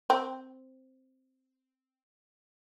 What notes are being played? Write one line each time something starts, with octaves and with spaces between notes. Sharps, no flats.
C4